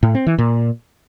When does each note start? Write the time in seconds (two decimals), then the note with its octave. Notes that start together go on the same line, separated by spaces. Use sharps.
0.03 A2
0.15 C4
0.27 E3
0.38 A#2